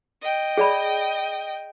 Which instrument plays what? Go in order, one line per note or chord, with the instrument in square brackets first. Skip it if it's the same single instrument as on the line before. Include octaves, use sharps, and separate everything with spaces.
[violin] D#5 G5
[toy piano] G#4 D5 B5